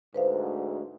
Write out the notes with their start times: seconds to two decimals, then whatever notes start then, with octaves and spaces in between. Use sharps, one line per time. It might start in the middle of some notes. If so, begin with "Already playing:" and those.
0.14 D2 G#2 B4 C5 F5